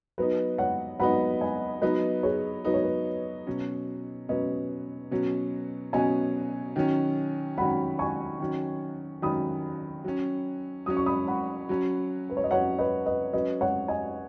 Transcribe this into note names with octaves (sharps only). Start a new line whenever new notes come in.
F#3 B3 D#4 B4
C#5 F#5
F#3 B3 D#4 F#5 B5
D#5 G#5
F#3 B3 D#4 B4 D#5
G#4 C#5
F#3 B3 D#4 B4
C#5
B4
B2 F#3 C#4
B2 F#3 C#4 B4 D#5
B2 F#3 C#4
B2 F#3 C#4 D#5 G#5
D#3 F#3 C#4
D#3 F#3 C#4 F#5 B5
G#5 C#6
D#3 F#3 C#4
D#3 F#3 C#4 B5 D#6
F#3 C#4
F#3 C#4 D#6
C#6
B5 D#6
F#5 B5
F#3 C#4
B4
C#5
D#5
F#3 C#4 C#5 F#5
B4 D#5
B4 D#5
F#3 C#4 B4 D#5
C#5 F#5
D#5 G#5